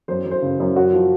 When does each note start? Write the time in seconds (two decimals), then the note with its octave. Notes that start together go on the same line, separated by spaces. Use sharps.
0.08 F#2 C5
0.25 F#2
0.31 C5
0.42 C#3
0.60 F#2
0.76 F#2 F#4
0.93 F3